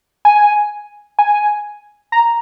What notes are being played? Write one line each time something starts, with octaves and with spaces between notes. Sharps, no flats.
G#5
G#5
A#5